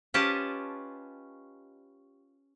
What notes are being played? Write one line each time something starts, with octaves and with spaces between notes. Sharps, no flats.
C#4 F4 G4 B4 D#5 A5